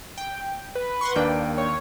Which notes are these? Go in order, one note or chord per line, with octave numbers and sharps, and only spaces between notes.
G5
B4
F#5 C6 C#6
D#2 A#3 D4 D5 G5
C#5